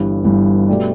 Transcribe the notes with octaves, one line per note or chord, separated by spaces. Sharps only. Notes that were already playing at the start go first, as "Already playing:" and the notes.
Already playing: G1 G2 E3
G1 G2 E3
B2 A3 G4 D5